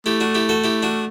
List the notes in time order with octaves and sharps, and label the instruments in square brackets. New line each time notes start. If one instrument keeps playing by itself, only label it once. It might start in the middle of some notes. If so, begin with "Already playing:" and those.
[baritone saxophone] A3 [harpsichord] E4 G4
[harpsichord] D4 F#4
E4 G4
F#4 A4
E4 G4
D4 F#4